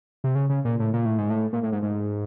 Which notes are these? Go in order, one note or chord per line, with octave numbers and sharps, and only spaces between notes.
C3
C#3
C#3
A#2
A2
A#2
A2
G#2
A2
A#2
A2
G#2
G#2